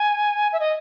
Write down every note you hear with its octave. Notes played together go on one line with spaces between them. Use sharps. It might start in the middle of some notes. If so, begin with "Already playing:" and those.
Already playing: G#5
E5
D#5